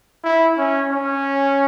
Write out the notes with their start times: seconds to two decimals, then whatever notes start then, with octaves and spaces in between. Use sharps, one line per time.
0.23 E4
0.57 C#4
0.91 C#4